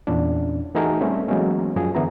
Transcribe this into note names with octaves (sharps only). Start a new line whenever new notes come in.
E2 A#2 C#4 D4
E3 A3 D#4 F#4 G#4 A#4
G3 A3 C4 C#4 G4
E3 F#3 G#3 A#3 B3 C#4
F#2 F3 G#4
D3 E3 B3 E4 A#5